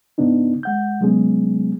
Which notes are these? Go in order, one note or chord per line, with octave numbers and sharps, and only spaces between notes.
G#2 C#3 B3 D4 D#4
G#3 F#5 G6
C3 F#3 G#3 B3 C#4 G#4